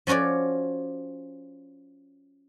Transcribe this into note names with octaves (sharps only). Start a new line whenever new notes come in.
F3 C#4 F#4 C#5 D5